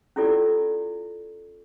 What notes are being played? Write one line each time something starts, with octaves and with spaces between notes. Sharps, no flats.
C#4 E4 F4 G4 A4 D5